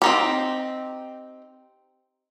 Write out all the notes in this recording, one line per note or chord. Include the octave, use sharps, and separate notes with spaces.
C4 D#4 G4